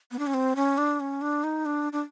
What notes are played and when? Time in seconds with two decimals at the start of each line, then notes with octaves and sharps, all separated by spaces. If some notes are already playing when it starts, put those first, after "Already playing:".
0.12 B3
0.19 D4
0.27 C#4
0.34 C4
0.56 C#4
0.78 D4
1.00 C#4
1.21 D4
1.44 D#4
1.66 D4
1.93 D4